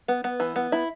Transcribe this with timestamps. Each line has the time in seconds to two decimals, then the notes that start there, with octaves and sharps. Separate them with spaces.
0.08 B3
0.24 B3
0.40 E3
0.56 B3
0.72 E4